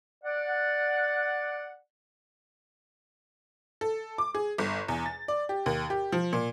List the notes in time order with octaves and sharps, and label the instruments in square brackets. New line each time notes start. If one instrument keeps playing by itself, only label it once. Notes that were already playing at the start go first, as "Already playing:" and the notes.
[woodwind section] D5 F#5
[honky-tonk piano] A4
D6
G#4
G1
E2
A6
D5
G4
D#2
G4
F3
A#2